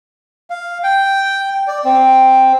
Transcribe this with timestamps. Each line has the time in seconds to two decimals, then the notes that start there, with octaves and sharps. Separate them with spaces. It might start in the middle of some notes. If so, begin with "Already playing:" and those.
0.50 F5
0.84 G5
1.68 D5
1.85 C4